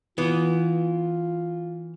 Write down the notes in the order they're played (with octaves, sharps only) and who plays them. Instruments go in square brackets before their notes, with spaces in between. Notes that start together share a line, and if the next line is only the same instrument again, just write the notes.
[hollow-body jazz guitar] E3 B3 [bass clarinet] F4